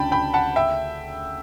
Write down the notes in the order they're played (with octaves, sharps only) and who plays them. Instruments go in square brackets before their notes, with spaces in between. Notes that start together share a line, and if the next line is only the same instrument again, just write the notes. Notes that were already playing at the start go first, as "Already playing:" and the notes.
Already playing: [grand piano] D2 C#3 D4 [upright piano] G5 A5 B5
[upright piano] G5 B5
F#5 A5
E5 G5